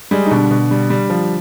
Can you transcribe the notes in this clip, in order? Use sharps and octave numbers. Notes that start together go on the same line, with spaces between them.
G3 G#3 G#4
D#4
B2 D3 D4
B2
G3
G3
F3